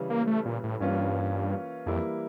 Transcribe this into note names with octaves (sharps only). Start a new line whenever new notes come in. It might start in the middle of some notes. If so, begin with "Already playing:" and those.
Already playing: C#3 E3 G3
A#3
A3
A#2
A2
G2 E3 A#3 C#4 F4
F2 E3 G3 A#3 E4